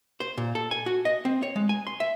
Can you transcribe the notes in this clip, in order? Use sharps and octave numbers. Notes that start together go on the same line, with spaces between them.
C5
A#2
A4
G#5
F#4
D#5
C4
C#5
G#3
G#5
C6
E5